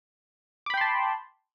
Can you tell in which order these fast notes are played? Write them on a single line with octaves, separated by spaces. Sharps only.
D6 B5 G5 C6 A5